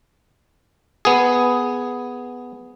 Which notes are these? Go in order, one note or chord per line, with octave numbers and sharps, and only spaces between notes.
B3 G#4